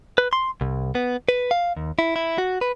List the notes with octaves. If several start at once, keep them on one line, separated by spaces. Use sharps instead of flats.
B4
C6
C2
B3
B4
F5
D#2
E4
E4
F#4
B4